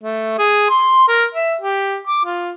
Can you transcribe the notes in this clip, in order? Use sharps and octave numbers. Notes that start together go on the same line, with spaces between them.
A3
G#4
C6
A#4
E5
G4
D6
F4